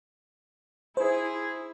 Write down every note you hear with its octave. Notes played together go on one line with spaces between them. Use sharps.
E4 G#4 C5